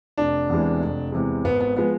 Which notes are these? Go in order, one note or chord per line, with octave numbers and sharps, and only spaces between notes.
F1 D4
E2 C3 E3 G#3
F1
E2 C3 E3 G#3
G#1 B3
B3
F3 G#3 B3